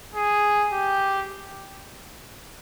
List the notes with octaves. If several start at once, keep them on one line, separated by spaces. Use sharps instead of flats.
G#4
G4